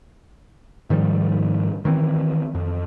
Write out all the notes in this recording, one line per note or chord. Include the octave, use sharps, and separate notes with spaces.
G#2 D#3 F3 G3
D#3 E3 A#3 C4
F2